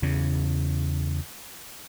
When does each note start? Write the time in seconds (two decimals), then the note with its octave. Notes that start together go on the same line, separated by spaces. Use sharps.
0.02 E2 C#3